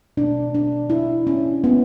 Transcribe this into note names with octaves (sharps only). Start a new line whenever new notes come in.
B2 A3 D4
D4
E4
C#4
B3